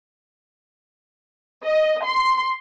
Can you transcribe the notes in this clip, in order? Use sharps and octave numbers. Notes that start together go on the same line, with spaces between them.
D#5
C6